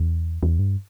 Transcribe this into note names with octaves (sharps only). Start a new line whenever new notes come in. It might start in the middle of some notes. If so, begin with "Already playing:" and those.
Already playing: E2
E2
G2